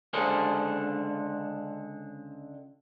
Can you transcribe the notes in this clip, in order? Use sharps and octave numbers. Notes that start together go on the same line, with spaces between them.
C#2 D3 D4 G#4 A4 C5